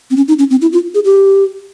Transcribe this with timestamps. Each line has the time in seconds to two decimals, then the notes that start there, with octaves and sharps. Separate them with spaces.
0.11 C4
0.17 C#4
0.28 D#4
0.39 C#4
0.50 C4
0.62 E4
0.73 F4
0.94 G#4
1.05 G4